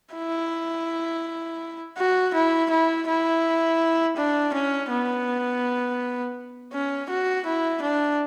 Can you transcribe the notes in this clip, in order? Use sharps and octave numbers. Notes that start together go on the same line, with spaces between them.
E4
F#4
E4
E4
E4
D4
C#4
B3
C#4
F#4
E4
D4